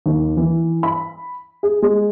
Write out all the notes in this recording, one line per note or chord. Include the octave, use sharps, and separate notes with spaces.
D#2
E3
B5
G#4
G#3